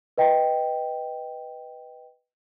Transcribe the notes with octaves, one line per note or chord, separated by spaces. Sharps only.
B4 D#5 G5